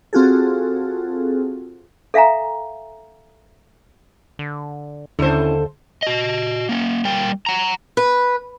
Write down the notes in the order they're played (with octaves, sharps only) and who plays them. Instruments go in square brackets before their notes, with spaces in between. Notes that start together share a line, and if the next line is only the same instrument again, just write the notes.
[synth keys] C4 F4 F#4 G#4 A4
[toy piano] A4 E5 F5 G#5 A#5
[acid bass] D3
[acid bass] D#2 [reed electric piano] D3 [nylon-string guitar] C#4 E4 [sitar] A4 C5
[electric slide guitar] F#4 D#5
A#3 C#4
G3 A#3 G5
F#5 A#5
[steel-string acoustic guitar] B4